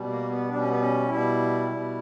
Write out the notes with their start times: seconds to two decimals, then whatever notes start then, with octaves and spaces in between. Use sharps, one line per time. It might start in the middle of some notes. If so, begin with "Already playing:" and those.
Already playing: B2 G3
0.08 A#3
0.29 B3
0.48 B2 G3 D4
0.58 C#4
0.68 B3
0.78 C#4
1.08 B2 G3 E4
1.69 B2 G3